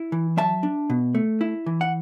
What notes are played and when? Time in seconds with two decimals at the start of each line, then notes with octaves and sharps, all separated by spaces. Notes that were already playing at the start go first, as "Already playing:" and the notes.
Already playing: E4
0.12 E3
0.37 F#3 E5 A5
0.63 D4
0.90 B2
1.15 A3
1.41 E4
1.66 E3
1.81 F#5